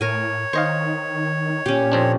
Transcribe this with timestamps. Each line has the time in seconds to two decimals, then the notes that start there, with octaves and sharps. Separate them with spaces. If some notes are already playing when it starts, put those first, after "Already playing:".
0.01 A2 A#4 C#5 G#5
0.53 D#3 C5 D#5 F5 C#6
1.66 A#2 C#4 G4
1.92 F2 C4 D4